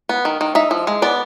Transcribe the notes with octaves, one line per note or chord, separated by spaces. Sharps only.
B3
D#3
D#3
D#4 E5
F3
G#3
B3 D5